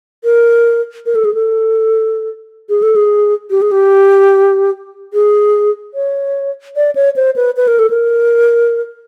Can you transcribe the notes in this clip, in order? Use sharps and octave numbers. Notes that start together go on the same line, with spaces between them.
A#4
A#4
A4
G#4
A4
G#4
A4
G#4
G4
G#4
G4
G#4
C#5
D5
C#5
C5
B4
B4
A#4
A4
A#4